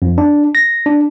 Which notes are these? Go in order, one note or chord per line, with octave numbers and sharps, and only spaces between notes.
F2
D4
A#6
D4